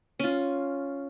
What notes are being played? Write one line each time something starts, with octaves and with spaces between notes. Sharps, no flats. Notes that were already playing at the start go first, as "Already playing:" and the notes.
C#4 F4